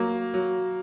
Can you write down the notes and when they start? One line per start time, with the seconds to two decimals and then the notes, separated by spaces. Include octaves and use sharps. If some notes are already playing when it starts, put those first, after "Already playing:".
Already playing: F#3 A#3
0.34 F#3